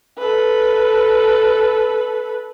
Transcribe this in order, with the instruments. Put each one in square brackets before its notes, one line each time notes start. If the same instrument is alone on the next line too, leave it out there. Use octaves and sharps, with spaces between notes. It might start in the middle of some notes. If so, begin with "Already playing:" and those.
[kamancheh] A4 B4